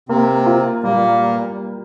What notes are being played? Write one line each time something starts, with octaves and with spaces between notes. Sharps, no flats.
C3 A#3 C4
F4
A#2 G3 A#3